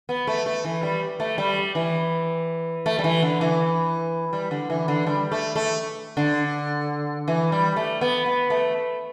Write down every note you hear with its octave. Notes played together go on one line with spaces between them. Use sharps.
B3
A3
A3
E3
G3
A3
G3
E3
A3
G3
E3
D3
E3
G3
D3
E3
D3
G3
A3
A3
D3
E3
G3
A3
B3
B3
A3